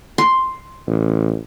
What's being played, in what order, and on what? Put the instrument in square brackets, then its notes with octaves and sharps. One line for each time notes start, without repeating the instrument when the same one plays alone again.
[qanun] C6
[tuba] A1